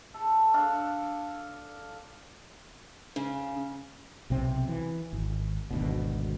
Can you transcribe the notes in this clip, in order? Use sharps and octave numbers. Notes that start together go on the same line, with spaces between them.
A4
D4 A4 F5
C#3
B1 C3 C4
E3
G#1
G#1 D2 B2